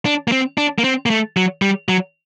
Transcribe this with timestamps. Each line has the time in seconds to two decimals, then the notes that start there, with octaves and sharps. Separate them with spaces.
0.05 D4
0.28 A#3
0.32 C4
0.58 D4
0.78 A#3
0.84 C4
1.06 A#3
1.10 A3
1.37 F#3
1.62 G3
1.89 F#3